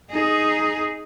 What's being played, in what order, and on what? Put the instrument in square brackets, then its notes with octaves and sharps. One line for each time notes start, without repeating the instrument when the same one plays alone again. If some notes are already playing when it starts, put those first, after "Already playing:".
[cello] D#4 G#4